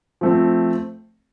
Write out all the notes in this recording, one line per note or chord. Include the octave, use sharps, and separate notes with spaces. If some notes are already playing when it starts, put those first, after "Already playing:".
F3 A3 C4